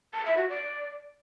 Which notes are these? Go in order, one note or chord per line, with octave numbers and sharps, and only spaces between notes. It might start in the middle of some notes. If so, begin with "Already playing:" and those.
A5
E5
F#4
D5